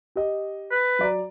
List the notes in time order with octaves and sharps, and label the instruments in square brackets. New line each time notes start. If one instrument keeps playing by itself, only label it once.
[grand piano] G4 D#5
[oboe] B4
[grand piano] F#3 D5 A#5